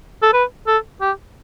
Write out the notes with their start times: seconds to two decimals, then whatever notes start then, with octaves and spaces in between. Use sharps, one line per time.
0.22 A4
0.34 B4
0.68 A4
1.01 G4